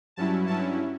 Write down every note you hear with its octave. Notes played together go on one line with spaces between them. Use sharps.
G2 F#3 C#4 E4 A5
G2 F#3 C#4 E4 A5